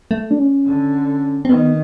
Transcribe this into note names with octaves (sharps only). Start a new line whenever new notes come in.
A3
D4
C#4
D3
C4
D#3 B3